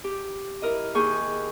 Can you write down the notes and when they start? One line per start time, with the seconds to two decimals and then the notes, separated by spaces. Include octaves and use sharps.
0.04 G4
0.62 E4 A#4 D#5
0.95 D#2 G#4 C#6 G6